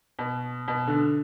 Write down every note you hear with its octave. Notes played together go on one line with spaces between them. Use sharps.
B2
B2
D3